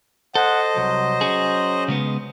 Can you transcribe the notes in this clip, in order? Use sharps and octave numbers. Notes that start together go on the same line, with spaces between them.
A4 C5 D#5 F#5
C2 F#3
C#4 G#4
C#3 G#3 B3